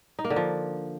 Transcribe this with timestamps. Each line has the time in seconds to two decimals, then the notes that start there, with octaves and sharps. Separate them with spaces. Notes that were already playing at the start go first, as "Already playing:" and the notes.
0.19 D#4
0.25 A#3
0.30 D3
0.36 F3